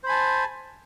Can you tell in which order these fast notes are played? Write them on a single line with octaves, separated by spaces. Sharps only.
C5 B5 G#5 A5